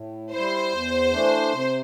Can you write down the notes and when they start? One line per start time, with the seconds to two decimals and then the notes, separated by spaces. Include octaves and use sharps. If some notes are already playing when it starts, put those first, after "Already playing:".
Already playing: A2
0.33 G3 E4 C5
0.73 E2
1.13 E3 A3 D4
1.52 C3